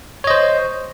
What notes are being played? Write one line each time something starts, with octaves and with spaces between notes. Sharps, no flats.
C5 C#5 D#5